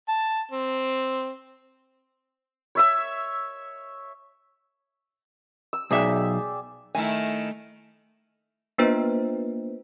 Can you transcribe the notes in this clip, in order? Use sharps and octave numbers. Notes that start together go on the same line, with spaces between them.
A5
C4
C#5 E5 E6
E6
B1 G#4 D5 E5 G5
D#3 A3 E4 G#5
A#3 B3 D4 F4 B4 C5